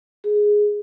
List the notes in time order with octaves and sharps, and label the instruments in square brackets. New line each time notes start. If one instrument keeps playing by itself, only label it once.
[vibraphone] G#4